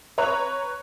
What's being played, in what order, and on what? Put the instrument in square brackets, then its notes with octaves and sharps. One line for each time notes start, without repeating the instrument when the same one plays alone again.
[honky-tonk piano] B4 C#5 A#5 C#6 F#6